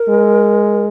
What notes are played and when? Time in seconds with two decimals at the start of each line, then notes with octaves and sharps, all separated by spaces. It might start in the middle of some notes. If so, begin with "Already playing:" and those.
Already playing: A#4
0.09 G#3